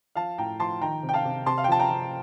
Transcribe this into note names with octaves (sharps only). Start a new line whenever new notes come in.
F3 F5 A5
A2 G5 A#5
F3 A5 C6
D#3 G5 A#5
C3
G5
F5 A5
C3
C3 A5 C6
F5
G5
F3 A5
G5 A#5
F3